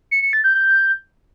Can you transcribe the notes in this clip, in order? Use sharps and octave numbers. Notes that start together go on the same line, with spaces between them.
C#7
C#7
A6
G6
G6